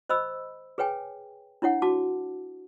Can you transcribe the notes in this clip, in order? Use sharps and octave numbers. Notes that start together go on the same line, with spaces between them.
C5 D#5 B5 E6
G#4 B4 C#5 G5 G#5
D4 E4 C#5 F#5
F#4 A5 D6